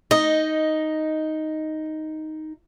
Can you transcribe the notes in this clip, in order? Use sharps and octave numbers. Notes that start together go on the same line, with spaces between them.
D#4 D#5